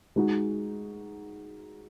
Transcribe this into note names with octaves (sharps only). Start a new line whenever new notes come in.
G#3 D#4 F#4